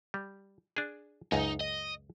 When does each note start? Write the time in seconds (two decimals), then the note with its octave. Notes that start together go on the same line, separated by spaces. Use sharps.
0.14 G3
0.77 D4 G#4
1.32 C#2 F#2 D#4
1.61 D#5